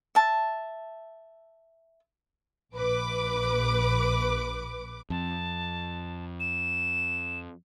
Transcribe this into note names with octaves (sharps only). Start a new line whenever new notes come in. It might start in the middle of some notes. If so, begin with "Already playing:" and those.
E5 A5
A#1 B4 D6
F2 A5
E7